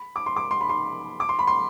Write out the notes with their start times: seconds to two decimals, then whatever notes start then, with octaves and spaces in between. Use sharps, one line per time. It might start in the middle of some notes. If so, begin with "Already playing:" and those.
Already playing: B5
0.16 D6
0.26 C6
0.36 D6
0.51 C6
0.61 B5
0.69 C6
1.20 D6
1.29 C6
1.39 B5
1.47 C6